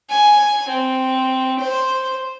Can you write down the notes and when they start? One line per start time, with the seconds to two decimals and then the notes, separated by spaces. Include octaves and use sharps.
0.10 G#5
0.68 C4
1.59 C5